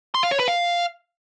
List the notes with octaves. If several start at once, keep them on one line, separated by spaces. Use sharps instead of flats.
C6
F5
C#5
B4
F5